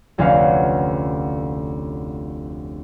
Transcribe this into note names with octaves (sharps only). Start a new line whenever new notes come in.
F1 D2 C#4 B4 F5 F#5